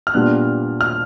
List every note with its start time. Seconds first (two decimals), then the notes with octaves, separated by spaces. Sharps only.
0.07 F6
0.14 A#2 G3 B3 D4 F#6
0.81 F6